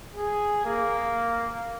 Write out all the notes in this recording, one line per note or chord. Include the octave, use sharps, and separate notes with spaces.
G#4
A#3